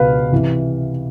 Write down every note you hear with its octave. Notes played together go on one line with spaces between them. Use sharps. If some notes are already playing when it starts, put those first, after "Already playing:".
Already playing: C#2 B2 B4 F5
C3 E3